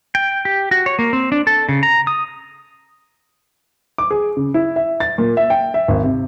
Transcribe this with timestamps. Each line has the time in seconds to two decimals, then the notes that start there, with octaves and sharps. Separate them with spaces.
0.15 G5
0.45 G4
0.71 F#4
0.86 C#5
0.99 A#3
1.13 C4
1.32 D4
1.47 A4
1.69 C#3
1.83 A#5
2.07 D#6
3.98 D6
4.11 G#4
4.37 C#3
4.54 E4
4.76 E5
5.00 A6
5.18 A#2
5.37 E5
5.50 G5
5.74 E5
5.88 G#1
6.03 C3